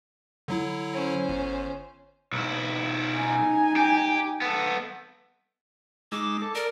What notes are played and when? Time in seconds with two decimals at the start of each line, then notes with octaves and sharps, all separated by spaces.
0.48 D3 F#3 E4
0.93 C#4 C5
1.29 G1
2.32 B1 E4
3.15 D#4 G#5
3.76 G4
4.41 B3 A4
6.12 G#3 D#4 D6 E6
6.42 A4
6.55 A#4 D5 A#5